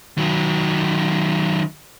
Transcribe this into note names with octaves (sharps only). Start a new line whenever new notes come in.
D#3 F#3